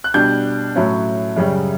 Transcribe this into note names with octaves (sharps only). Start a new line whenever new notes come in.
F#6
B2 G3 D4 G6
A2 F#3 C#4 E4
F#2 C#3 G3